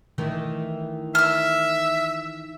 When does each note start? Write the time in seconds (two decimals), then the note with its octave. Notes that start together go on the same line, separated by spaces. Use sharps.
0.18 D#3 E3 A3
1.15 E5 E6 F6